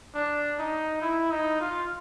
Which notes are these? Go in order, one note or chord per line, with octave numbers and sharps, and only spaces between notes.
D4
D#4
E4
D#4
F4